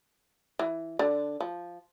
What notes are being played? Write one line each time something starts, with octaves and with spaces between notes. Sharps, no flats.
E3
D3
F3